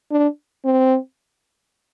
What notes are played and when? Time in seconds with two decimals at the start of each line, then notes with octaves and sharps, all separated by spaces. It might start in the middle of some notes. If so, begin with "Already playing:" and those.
0.11 D4
0.65 C4